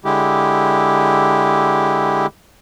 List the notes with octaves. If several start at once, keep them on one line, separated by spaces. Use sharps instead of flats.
D3 G#3 E4 G4